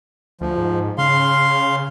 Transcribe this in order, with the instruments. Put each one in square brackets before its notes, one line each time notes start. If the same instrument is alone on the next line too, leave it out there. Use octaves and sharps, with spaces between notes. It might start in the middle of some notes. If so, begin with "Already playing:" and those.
[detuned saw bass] D2 [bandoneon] F3
[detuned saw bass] G#2
[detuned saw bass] C#3 [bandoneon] F5 C6